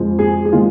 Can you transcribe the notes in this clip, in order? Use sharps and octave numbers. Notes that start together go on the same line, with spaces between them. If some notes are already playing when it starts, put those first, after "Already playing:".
Already playing: F2 F3 G#3
G#4
G#4
D#3 G#3 F4